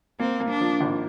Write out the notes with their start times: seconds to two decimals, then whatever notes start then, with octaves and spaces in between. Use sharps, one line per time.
0.20 A#3 C4
0.40 A#3
0.50 D4
0.61 F3
0.81 G#1